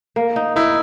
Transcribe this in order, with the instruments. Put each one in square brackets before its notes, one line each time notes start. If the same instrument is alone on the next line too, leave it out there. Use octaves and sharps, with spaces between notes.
[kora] A#3
D#4
[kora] D#4 [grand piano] E4